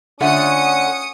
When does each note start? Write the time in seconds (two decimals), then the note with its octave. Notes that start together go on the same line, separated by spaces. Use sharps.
0.21 D3 A3 C#4 F4 F#5 D#6 C#7